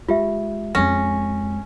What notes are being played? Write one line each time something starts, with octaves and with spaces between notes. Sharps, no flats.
G#3 F4 G4 E5
F2 G#3 C#4 A#6